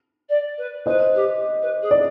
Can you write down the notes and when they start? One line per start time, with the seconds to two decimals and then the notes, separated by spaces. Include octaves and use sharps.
0.29 D5
0.57 B4
0.86 B4 C5 D#5
1.14 G4
1.62 B4
1.82 G#4
1.91 D5